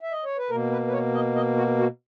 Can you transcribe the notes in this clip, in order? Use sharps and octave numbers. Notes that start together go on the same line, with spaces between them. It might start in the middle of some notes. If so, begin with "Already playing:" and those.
E5
D#5
C#5
B4
B2 A#3 A#4
B4
B4
C#5
D#5
D#5
F#4
F#4